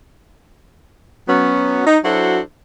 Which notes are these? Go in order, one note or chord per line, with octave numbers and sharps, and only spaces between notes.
F#3 B3 C#4
D#4
F#3 D4 E4 F#4 A4 C5